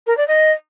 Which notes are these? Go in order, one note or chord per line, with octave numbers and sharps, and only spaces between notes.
A#4
D5
D#5